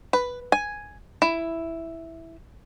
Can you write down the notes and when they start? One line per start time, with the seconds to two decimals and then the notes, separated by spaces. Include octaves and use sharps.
0.13 B4
0.52 G#5
1.22 E4